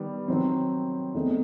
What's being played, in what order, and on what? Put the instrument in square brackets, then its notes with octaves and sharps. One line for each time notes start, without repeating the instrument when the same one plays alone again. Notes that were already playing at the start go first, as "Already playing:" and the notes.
Already playing: [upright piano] D#3 G3 B3
D#3 F#3 C4
E2 D#3 A3 C4 D#4